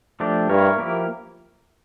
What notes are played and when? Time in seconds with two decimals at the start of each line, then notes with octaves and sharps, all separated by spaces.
0.20 F3 A3 D4 G4
0.49 G2 A#3 E4 A#4 C#5
0.78 F3 A#3 E4 G4 A#4